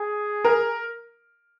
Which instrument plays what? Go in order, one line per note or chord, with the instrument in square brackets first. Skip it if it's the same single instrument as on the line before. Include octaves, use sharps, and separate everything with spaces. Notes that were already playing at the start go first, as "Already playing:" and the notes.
Already playing: [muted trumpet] G#4
[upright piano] A#4